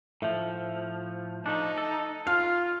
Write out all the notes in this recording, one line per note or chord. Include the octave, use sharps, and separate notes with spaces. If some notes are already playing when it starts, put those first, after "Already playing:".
A2 F3 E5
F3 A3 D4 D#4
A4
F4 F5 F6